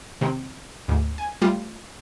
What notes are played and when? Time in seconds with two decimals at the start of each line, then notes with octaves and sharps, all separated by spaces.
0.21 C3 D#3 C4
0.88 D2 G#2
1.18 G#5
1.42 G3 A3 F4